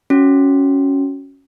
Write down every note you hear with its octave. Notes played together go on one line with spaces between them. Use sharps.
C#4 F#4